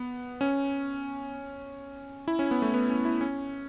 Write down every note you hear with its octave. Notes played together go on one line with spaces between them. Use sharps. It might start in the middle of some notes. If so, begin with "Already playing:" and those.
Already playing: B3
C#4
E4
C#4
B3
A3
B3
C#4
E4
C#4